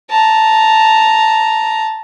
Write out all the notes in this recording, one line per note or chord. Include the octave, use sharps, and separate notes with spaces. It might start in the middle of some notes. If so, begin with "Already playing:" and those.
A5 A#5